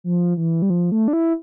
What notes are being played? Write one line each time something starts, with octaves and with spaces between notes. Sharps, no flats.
F3
E3
G3
F3
A3
D4
E4